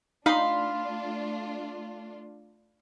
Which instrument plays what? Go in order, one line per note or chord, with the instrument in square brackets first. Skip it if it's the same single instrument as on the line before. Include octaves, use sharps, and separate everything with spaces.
[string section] A3 D4 F4 [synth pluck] D#4 [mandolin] F5 [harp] B5 C6